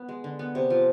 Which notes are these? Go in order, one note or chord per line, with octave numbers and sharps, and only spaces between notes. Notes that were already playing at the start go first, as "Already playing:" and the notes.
Already playing: B3
G#3
D3
B3
C3
F3